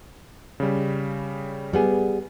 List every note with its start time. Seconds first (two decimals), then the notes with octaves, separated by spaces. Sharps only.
0.60 C#3 G3
1.73 G3 B3 G#4